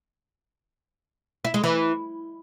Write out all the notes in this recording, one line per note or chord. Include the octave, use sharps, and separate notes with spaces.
E4
G#3
E3